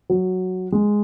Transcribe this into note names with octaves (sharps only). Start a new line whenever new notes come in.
F#3
G#3